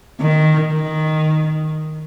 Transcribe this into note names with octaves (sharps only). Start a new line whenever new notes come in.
D#3
D#3